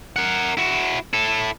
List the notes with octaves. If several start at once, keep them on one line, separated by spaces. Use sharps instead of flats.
A#4 F#5
E4 F#4
E4 A4